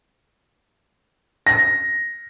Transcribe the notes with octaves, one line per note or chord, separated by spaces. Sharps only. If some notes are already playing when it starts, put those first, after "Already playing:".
A#6